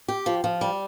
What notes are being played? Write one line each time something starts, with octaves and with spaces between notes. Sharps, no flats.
G4
F3
F3
G3